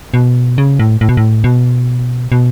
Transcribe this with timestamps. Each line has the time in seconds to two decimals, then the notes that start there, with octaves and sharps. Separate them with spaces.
0.14 B2
0.58 C#3
0.79 A2
1.01 A2
1.09 B2
1.17 A2
1.44 B2
2.32 B2